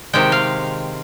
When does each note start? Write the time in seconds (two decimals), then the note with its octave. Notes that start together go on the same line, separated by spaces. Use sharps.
0.13 C3 D#3 G#3 G5
0.32 F5